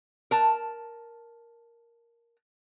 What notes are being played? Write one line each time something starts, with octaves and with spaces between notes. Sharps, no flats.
A#4 A5